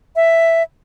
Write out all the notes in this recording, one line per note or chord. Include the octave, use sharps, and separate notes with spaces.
E5